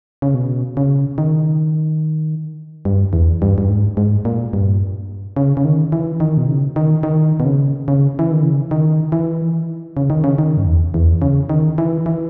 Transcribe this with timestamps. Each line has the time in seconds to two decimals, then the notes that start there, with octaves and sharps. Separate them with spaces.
0.22 C#3
0.35 B2
0.77 C#3
1.18 D#3
2.85 G2
3.13 E2
3.42 G2
3.58 G2
3.69 G#2
3.97 G#2
4.25 A#2
4.53 G2
5.37 C#3
5.57 C#3
5.65 D#3
5.92 E3
6.20 D#3
6.37 B2
6.48 C#3
6.76 D#3
7.03 D#3
7.40 B2
7.45 C#3
7.88 C#3
8.19 E3
8.31 D#3
8.43 C#3
8.71 D#3
9.12 E3
9.97 C#3
10.10 D#3
10.24 C#3
10.38 D#3
10.57 G2
10.66 E2
10.94 E2
11.22 C#3
11.49 D#3
11.78 E3
12.06 E3